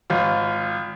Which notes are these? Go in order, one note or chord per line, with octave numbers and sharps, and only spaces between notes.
G#1 F4